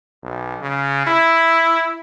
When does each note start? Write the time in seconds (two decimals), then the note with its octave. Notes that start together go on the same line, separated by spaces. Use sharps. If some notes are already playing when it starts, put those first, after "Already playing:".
0.23 B1
0.61 C#3
1.07 E4